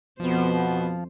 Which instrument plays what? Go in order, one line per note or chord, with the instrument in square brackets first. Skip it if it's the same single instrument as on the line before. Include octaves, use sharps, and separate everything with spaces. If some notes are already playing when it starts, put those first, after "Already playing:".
[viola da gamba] F2 C5 [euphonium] B2 [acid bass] F3 [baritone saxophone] B3